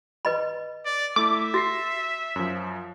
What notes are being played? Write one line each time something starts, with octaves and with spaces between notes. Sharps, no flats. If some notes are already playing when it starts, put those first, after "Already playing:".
B4 D#5 B5
D5
A3 E4 E5 D6
F#4 A6 A#6 C7
F#2 F3